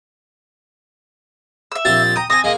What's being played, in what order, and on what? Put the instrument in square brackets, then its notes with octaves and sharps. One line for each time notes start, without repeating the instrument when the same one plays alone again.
[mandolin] E5 E6
[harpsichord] A#1 C4 G4 [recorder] A6
[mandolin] G5 A#5 [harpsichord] D#6
[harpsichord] C4 [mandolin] G#5 D#6 [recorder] A#6
[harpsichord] G#3 A#3 [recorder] D#5